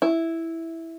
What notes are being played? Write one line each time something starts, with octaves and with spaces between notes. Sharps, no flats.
E4